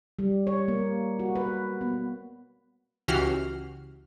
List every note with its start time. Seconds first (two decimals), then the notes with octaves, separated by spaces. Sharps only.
0.19 G3
0.47 C#5
0.68 A#3
1.19 F#4
1.36 B4
1.81 B3
3.08 C#2 E3 F#4 G4 F6 C7